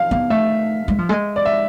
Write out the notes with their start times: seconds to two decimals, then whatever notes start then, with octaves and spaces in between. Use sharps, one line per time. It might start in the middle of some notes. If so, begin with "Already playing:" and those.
Already playing: F5
0.11 B3 F5
0.30 A3 E5
0.88 G#3
0.98 F3
1.09 G#3
1.36 D5
1.45 E5